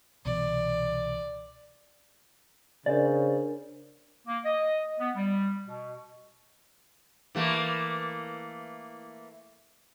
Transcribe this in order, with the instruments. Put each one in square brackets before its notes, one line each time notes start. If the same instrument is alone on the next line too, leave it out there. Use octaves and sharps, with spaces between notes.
[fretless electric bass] C2 B2 E3 [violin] D5
[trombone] C#3 [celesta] D4 A#4 G#5 [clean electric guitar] C5 D5
[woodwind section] A#3
D#5
B3
G3
B2
[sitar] E3 A3 A#3